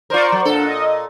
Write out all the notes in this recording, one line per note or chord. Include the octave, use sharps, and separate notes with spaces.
F4 A#4 C5 D5 C#6
F#3
A#2 D4 A4 F#5
D#5